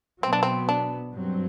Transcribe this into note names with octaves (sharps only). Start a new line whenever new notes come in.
B2 F#3 B3 C4
D4
C4
D4
G2 F#3 C4